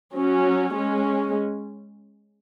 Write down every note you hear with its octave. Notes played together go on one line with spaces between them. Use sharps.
F#3 C#4
G#3 C#4